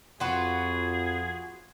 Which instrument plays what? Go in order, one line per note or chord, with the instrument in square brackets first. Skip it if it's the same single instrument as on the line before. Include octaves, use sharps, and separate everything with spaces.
[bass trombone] F2 [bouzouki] F4 F#4 B4 [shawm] G#4